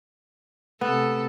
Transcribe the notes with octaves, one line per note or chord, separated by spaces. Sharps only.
C3 A3 B3 A4